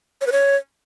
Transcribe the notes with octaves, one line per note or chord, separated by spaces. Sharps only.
C#5
B4
C#5